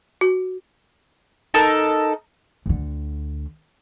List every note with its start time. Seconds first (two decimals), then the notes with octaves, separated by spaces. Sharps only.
0.21 F#4
1.54 D#4 A4 A#4 A5
2.66 D2 D3